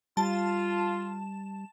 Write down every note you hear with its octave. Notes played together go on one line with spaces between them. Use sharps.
G3 F4 A5